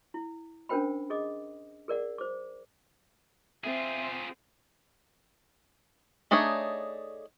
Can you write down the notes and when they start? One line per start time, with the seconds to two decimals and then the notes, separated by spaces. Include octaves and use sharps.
0.14 E4
0.69 C#4 D4 A#4 C5 G5 B5
1.10 G#4 D#5 D6 D#6
1.88 G#4 A#4 D5 F#5
2.18 C5 D6
3.64 C4 F4 G#4 E5
6.31 A3 D4 D#4 G#4 C#5